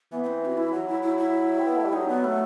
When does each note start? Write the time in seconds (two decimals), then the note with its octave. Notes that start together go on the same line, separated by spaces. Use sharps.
0.12 E3 B3
0.24 B3
0.26 C4
0.45 F#4
0.57 E4
0.72 F#3 F#4
0.88 E4
1.02 E4
1.18 E4
1.58 C4
1.67 B3
1.76 A3
1.85 G3
1.93 F#3 D#4
2.09 B3
2.24 A3